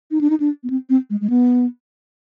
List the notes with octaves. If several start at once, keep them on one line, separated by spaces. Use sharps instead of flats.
D#4
D4
D#4
D4
B3
C4
C4
G#3
G#3
B3